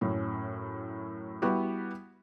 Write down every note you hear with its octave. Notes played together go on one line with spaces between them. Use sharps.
F#2 A2 C#4
G3 B3 E4 F#4 G4